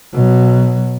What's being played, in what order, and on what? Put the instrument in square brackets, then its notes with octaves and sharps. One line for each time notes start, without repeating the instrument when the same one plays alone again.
[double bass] B2 F#3